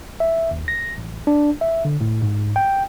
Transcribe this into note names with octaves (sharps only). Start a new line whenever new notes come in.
E5
D#2
A#6
A1
D4
E5
D3
A2
G#2
G5